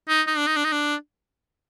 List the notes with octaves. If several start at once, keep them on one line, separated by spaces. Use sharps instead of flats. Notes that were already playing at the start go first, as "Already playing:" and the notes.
D#4
D#4
D4
D#4
D4
D#4
D4